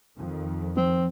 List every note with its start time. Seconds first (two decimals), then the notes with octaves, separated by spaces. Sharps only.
0.18 F2 D#3
0.77 F3 C4